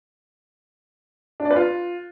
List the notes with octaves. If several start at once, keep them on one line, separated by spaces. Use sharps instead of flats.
D4
D5
B4
F4